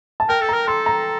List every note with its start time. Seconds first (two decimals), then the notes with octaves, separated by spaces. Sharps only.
0.20 A5
0.29 A#4 G5
0.41 A4
0.49 A#4 A#5
0.67 A4 C6
0.86 A#5